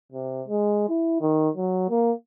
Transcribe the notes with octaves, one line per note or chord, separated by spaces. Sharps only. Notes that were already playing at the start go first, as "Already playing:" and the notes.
C3
G#3
E4
D#3
F#3
A#3